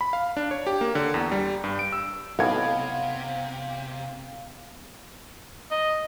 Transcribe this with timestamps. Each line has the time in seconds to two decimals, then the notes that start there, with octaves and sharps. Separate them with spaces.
0.01 B5
0.13 F5
0.37 D4
0.51 C#5
0.67 G4
0.81 A#3
0.95 D3
1.14 E2
1.32 G3
1.64 G2
1.79 D7
1.92 E6
2.39 B1 A2 C3 B3 F5 G#6
5.71 D#5